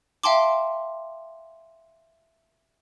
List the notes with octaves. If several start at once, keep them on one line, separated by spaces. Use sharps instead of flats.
E5 F5 G5 A5 C6 D6